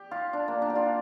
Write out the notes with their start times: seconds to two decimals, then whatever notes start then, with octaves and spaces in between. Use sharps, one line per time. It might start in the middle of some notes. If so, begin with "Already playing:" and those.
Already playing: G4
0.11 F4
0.33 D4
0.48 A#3
0.62 D4
0.70 G4
0.76 F4